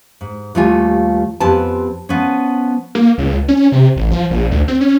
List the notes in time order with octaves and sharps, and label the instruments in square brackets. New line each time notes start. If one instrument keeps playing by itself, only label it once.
[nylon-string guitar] G#2
D#2 F3 G3 A3 F4 G#5
F2 B3 C4 G4 G#5 A5
F3 B3 C#4
[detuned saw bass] A#3
C#2
C#4
C3
A1
F3
A#1
D2
C4
C#4